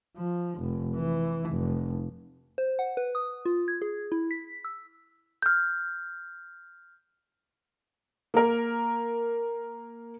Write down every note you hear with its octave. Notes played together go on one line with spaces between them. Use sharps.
F3
F1
E3
F1
C5
F#5
B4
D#6
F4
G#6
G#4
E4
B6
E6
F6 G6
A#3 A#4